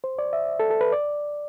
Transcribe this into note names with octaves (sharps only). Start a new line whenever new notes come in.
C5
D5
E5
A4
A4
B4
D5